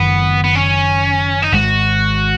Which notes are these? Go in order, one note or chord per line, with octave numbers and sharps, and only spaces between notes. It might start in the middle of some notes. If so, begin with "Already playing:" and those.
Already playing: F#1 F#2 D#3 B3
B3
C#4
D#4
G#1 G#2 G#3 F#4